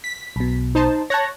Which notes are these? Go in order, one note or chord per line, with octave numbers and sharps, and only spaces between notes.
B6
B1 B2
D#4 C5 A5
C#5 A5 F#6 A#6